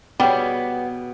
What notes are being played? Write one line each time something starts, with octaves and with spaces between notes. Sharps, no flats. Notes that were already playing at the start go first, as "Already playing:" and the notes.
B2 G3 B3 G#4 C#5 G5